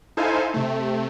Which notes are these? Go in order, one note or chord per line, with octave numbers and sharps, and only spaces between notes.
D#4 E4 A4 C5 F5 G#5
C3 A3